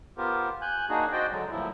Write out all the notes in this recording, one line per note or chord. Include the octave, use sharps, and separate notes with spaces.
B3 F4 G4 A#4 C5
G#5 F#6 G6
A#3 D4 D#4 F#4 G#4
F#4 C5 D5 D#5 G5
D3 F#3 G#3
D2 G2 A#2 F3 F#3 E4